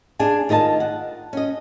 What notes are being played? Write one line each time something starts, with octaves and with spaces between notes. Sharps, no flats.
D4 G#4 F5 G#5
D#3 F4 D#5 E5 A5
F#5
C#4 D#5